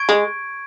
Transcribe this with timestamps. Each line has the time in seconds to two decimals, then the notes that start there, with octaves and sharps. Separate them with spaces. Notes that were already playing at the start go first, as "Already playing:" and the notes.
Already playing: C#6 G#6 D7
0.09 G#3